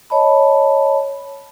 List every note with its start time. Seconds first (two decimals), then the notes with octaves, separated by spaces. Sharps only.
0.10 C#5 D#5 A5 B5